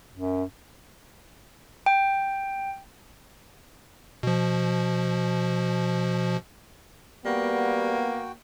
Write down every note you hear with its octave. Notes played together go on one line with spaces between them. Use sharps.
F#2
G5
B2 F3
G3 A#3 B3 F#4 G5